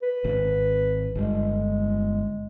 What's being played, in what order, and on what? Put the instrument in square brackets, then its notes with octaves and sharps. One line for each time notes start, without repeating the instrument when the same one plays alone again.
[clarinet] B4
[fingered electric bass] G#1
[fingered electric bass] G1 [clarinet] G#3